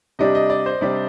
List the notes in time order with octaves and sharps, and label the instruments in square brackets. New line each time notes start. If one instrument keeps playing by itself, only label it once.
[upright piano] C3 G3 D4 G4 [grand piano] D#5
[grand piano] D#5
D5
C5
[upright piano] C3 G3 D4 G4